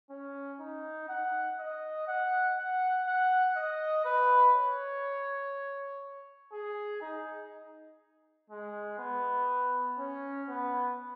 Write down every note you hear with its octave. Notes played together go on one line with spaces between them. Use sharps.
C#4
D#4
F#5
D#5
F#5
F#5
F#5
D#5
B4
C#5
G#4
D#4
G#3
B3
C#4
B3